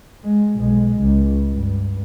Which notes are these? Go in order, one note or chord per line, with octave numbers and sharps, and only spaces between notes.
G#3
B1 G#3
C#2
G2